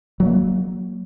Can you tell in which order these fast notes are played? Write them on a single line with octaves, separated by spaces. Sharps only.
F#3 A3 A#3